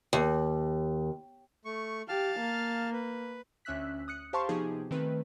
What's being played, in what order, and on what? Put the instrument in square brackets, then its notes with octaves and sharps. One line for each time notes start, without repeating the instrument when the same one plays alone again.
[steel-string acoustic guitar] D#2
[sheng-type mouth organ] A3 C#6
[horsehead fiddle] G4 [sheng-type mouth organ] F5 A5 F6
[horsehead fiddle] A#3
[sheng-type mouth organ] B4
[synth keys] D2 C#4 E5 E6 F#6 B6
D#6 F#6 C#7
G4 C5 F5 A5 C6 C#6
C3 F3 B3 D#4 G4 G#4
D#3 A3 C4 B4